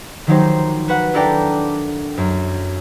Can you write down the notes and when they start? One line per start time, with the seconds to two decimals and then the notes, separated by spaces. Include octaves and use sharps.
0.27 D#3 F3 F#3 D#4 G4 C5
0.88 F#4 B4 F#5
1.14 D4 E4 A4 A#4 D5 G5
2.18 F#2